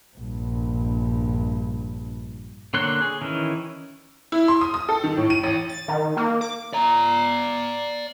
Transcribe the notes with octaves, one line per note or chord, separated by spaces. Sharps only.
A#1 G2
D3 A#3 C#5 C6 F#6
G#4
D#3 E3 C#4
E4
C6
D#6
D#6
A4
D#3
A2
D#7
A1
A6
D#3
A#3
D6
D5 A#5